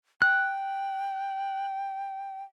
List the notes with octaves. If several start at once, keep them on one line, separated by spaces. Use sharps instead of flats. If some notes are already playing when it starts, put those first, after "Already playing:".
G5 F#6